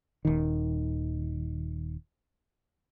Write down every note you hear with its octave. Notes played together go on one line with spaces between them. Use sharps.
D#1 D#3